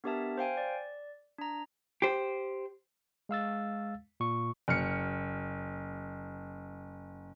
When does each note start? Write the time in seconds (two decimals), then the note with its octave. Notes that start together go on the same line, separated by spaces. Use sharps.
0.04 B3 D4 G4 A#4 E5 A5
0.37 C5 F5 G5 G#5
0.57 D5
1.39 D4 A#5
2.02 G4 C5
3.29 G#3 F5 E6 A6
4.20 A#2 C#6
4.68 F#1 F6 C#7